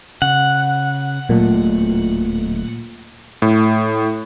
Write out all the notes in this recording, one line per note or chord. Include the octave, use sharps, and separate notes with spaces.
C#3 F#5
D1 A#2 F#3 A3
A2